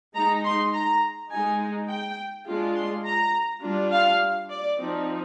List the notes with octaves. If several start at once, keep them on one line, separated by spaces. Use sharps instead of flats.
G#3 D#4 A#5
C6
A#5
G#3 D#4 G#5
G5
G#3 D4 F4
C6
A#5
G3 D4 F4
F5
D5
F3 C4 D#4